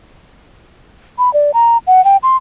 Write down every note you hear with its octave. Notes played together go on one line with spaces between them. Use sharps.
B5
D5
A#5
F#5
G5
C6